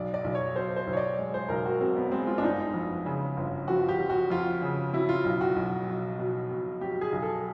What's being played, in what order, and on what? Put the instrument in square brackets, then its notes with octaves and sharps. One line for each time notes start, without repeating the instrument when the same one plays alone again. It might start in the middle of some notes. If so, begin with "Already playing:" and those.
Already playing: [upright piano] B1 D5
D5
B1
C#5
B2 C5
C5
B1
C#5
D5
G#3
C5
B1 A#4
F#4
B2 C4
B3
G#3 C4
F4
D4
G1 D#4
F2
C#3
G1
F3 F#4
G4
F3
F#4
F2 F4
C#3
F#3 E4
F4
B1
F#4
B1
B2
B2
B2
F#3 G4
G#4
B1
A4